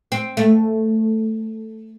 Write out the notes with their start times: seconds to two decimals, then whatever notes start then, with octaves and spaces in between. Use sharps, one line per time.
0.12 C4
0.37 A3